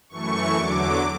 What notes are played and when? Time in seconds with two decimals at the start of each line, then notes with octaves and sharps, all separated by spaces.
0.09 F#2 E3 A3 C#6
0.54 E2 D3 F#3 D6